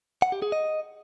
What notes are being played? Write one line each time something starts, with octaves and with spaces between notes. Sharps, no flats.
F#5
G4
G#4
D#5